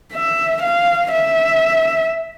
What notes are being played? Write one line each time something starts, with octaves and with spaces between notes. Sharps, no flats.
E5
F5
E5